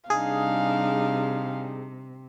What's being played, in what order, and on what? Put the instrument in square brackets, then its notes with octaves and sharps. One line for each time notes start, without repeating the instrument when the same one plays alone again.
[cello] C3 [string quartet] G3 D4 D#4 [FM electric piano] G#4 [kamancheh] F5